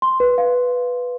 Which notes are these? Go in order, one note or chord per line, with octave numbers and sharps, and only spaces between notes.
C6
B4
F5